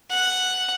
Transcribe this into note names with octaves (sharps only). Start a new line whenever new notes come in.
F#5